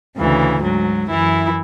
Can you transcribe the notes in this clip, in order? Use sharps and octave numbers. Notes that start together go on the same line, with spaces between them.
D2 C#3 E3
G#2 F#3
F#2 E3 E4